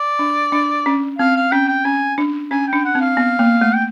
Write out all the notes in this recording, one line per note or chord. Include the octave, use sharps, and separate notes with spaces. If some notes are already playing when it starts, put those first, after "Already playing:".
Already playing: D5
D4
D4
C#4
C4 F5
F5
C#4 G5
G5
C#4 G#5
D4
C#4 G#5
D4 G5
F#5
C4
F5
B3
A#3
A3
G5